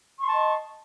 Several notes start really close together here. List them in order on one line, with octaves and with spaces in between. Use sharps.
C#6 C6 A5 D#5